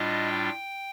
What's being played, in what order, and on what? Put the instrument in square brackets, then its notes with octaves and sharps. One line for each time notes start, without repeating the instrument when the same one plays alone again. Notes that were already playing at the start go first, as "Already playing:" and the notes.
Already playing: [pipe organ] A2 G3 D4 F4 D#5
G5